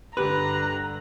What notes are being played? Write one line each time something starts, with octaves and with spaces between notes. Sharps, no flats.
G2 D3 G4 B4 A#5 F#6